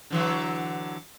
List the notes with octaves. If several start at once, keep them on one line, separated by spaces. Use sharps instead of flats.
D3 E3 F#3